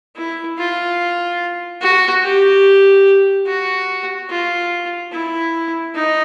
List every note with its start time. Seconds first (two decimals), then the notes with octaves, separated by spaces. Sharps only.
0.16 E4
0.57 F4
1.81 F#4
2.23 G4
3.46 F#4
4.29 F4
5.12 E4
5.94 D#4